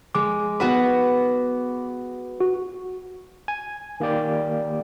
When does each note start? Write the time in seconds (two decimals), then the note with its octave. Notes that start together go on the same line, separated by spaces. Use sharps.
0.15 G#3 D6
0.60 B3 F#4 B4
2.41 F#4
3.48 G#5
4.00 D#3 A#3 G4 D5 G5